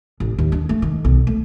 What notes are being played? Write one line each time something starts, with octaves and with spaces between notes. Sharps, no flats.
A1
D#2
D4
A3
D#3
B1
A3